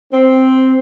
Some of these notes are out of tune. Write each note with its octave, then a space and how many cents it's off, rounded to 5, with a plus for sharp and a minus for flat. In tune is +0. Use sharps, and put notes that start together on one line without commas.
C4 +0